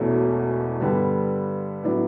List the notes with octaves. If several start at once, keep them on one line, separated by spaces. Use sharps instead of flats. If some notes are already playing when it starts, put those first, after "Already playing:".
Already playing: E1 E2 B2 A3 C#4
G2 D3 G3 B3
A2 F#3 B3 D4